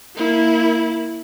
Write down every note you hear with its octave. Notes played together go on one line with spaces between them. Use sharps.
A#3 E4